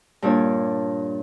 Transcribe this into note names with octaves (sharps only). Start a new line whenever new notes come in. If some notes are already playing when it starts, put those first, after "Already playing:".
G2 A#2 D4 C#5